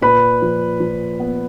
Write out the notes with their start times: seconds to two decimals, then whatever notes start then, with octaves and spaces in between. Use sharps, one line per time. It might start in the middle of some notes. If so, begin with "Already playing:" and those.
0.01 A#2 B4 B5
0.42 F3
0.80 F3
1.20 B3